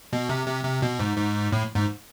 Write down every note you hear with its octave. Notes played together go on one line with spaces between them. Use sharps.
B2
C3
C3
C3
B2
G#2
G#2
A2
G#2